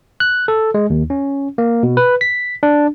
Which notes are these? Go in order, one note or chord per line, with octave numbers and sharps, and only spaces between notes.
F#6
A4
G#3
D#2
C#4
A#3
B2
B4
B6
D4